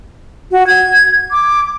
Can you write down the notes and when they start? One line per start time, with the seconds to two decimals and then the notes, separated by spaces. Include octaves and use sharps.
0.52 F#4
0.67 G#6
1.32 D6